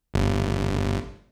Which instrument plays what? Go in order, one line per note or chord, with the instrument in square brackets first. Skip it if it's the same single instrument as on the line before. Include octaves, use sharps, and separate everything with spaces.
[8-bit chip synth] G1